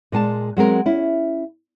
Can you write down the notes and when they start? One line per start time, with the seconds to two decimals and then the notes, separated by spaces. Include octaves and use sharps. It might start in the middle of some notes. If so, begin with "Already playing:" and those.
0.12 A#2 G#3 G#5 A5
0.57 F#3 G#3 C4 A#4
0.86 C#4 E4